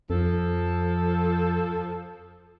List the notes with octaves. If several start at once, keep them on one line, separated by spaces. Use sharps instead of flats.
F2 F3 A4